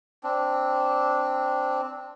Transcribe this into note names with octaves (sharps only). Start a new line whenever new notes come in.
C4 D4